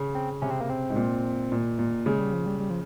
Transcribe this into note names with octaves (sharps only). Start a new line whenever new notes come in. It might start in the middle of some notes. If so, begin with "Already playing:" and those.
Already playing: C#3
C4
C3 C#4
C4
A#3
C4
G#2
A#2
A#2
A#2
C#3 G#3
G3
F3
G3
G3
F3